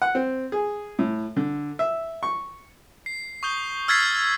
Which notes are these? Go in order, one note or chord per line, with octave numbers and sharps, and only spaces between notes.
F#5
C4
G#4
A2
D3
E5
C#6
C7
C#6 D#6 G6 G7
E6 F6 G#6 A6 B6 C7